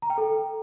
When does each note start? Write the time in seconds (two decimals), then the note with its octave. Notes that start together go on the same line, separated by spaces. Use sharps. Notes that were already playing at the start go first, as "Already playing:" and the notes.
0.02 A#5
0.10 G5
0.18 A4